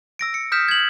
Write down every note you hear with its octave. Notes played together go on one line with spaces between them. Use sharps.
E6 A#6 D7
C#7
D#6 F6 G6 B6 E7
G#6 F#7